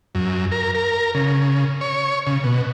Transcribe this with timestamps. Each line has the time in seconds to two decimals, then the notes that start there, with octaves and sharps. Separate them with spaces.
0.15 F#2
0.52 A#4
0.75 A#4
1.15 C#3
1.81 C#5
2.27 C#3
2.44 B2